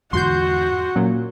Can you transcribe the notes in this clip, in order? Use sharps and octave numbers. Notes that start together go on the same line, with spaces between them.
E2 G#2 D3 F#4 C6 G6
A#2 F#3 C#4